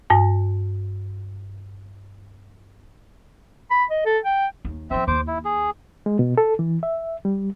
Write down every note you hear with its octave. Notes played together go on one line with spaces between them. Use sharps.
G2 A5
B5
D#5
A4
G5
D#2
E3 F3 C4 E5
D#2 C5 D6
E4
G#4
G#3
B2
A4
E3
E5
G3